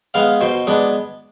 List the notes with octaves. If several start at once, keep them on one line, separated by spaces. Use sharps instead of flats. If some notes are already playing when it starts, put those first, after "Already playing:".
G#3 B3 F5
B2 C5
G#3 B3 D4